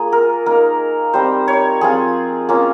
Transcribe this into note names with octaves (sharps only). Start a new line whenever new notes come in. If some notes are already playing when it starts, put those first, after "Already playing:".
Already playing: A#3 F4 G#4
A#4
A#3 D#4 A#4
G3 C4 D#4 C5
C#5
F3 C4 F4 G#4
A#3 C#4 F4